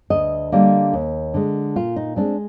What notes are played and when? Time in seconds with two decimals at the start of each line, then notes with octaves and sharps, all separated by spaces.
0.10 D2 D#5
0.52 D3 G3 A#3
0.93 D#2
1.34 D3 G#3
1.76 A#2 F4
1.96 D#4
2.16 G#3 C4 D4